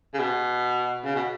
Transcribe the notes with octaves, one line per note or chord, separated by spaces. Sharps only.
C#3
B2
C#3
B2